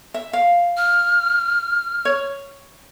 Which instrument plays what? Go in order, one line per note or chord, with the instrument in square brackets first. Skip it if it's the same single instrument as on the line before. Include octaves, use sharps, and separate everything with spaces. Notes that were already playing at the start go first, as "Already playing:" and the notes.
[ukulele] E5
F5
[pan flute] F6
[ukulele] C#5